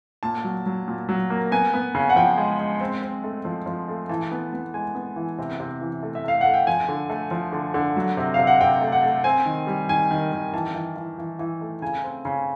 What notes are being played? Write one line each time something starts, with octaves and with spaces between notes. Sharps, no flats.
A#2 A5
F#3
F#3
A#2
F#3
A#3
B3 G#5
B3
C#3
F#5
F3 G5
G#3
G#3
C4
C4
A3
F3
F3
A3
E3 A5
B3
B3
G#3 G#5
B3
E3
C3
C3
E3
A3
E5
A3 F5
A3 F#5
G5
F3 G#5
D3
A3
F3
D3
D3
F#3
C3
C3 F5
F#5
C3 G5
A3
F#5
A3
C4 G#5
D#3
G3
D#3 G#5
D#3
D#3
E3 A5
E3
E3
E3
E3
A3
C#3 G#5
C4
C#3